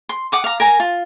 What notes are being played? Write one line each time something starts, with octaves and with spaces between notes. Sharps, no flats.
C6
F#5 D6 D#6
F5 A#5
A#4 G#5 A#5
F4